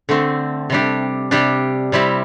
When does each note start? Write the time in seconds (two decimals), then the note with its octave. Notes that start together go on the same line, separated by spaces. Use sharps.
0.09 D3 A3 C4
0.70 C3 G3 D4 G4
1.31 C3 G3 D4 G4
1.92 C3 G3 C4 E4 G4